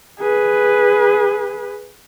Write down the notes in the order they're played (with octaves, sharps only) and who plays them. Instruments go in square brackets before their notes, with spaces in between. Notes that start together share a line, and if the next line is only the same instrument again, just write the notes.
[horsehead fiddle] G#4 B4